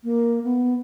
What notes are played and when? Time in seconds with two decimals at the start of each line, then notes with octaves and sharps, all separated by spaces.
0.04 A#3
0.44 B3